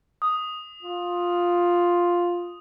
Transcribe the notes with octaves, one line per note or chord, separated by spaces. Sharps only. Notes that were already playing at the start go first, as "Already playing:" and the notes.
D#6
F4